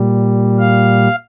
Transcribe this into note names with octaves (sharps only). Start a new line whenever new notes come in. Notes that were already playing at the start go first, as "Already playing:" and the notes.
Already playing: A#2 G3
F5